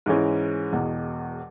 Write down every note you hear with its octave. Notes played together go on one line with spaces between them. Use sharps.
G#2 E3 G#3 C#4
E1 E2 B2